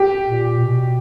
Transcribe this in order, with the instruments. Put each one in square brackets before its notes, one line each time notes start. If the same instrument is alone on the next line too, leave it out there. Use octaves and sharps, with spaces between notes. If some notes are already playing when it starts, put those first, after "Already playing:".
Already playing: [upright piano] G4
[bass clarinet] A#2
B2